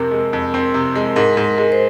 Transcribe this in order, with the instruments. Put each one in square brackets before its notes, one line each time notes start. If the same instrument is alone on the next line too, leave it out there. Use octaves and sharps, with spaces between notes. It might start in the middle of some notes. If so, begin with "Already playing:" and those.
Already playing: [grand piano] F2 C3 C4 [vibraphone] A#4
[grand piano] G#3
F2
C4
C3
G#3
[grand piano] G#2 [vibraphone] A#4
[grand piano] G#2
[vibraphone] A#4
[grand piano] G#3
[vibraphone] C5